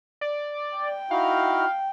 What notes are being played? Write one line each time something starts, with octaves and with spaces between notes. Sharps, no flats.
D5
G5
D#4 E4 F#4 F5